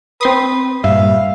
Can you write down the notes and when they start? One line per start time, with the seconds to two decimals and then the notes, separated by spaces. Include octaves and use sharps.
0.21 C4 B4 C6 D#6
0.84 G2 A#2 E5 F5